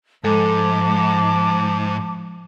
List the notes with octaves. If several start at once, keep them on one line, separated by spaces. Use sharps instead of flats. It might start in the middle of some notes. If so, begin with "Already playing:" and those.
G#2 F3 G#3 A4 A5 D6